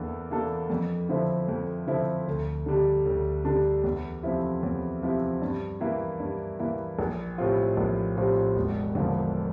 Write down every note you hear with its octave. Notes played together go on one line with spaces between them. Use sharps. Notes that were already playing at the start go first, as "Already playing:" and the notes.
Already playing: E2 E3 A#3 D4 A4
E3 A#3 D4 A4
F2
D3 F3 C4 E4
F2
D3 F3 C4 E4
D2
D3 G3 D4
D2
D3 G3 D4
E2
C3 F3 C4 E4
E2
C3 F3 C4 E4
G2
E3 A#3 E4
G2
E3 A#3 E4
A#1
A2 G3 C4 F4
A#1
A2 G3 C4 F4
E1
E2 D3 F3 A#3